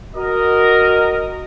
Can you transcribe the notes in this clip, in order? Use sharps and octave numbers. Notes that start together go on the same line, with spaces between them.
F#4 A#4 D#5